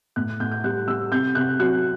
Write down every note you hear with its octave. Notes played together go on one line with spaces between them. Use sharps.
A2 F#6
A2 G6
G6
G3 F#6
G3 E6
C3 G6
C3 F#6
F#3 F#6